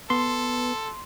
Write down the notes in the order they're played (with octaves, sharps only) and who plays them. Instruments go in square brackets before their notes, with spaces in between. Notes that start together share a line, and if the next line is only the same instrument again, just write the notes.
[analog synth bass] B3 [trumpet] A4 [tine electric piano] C6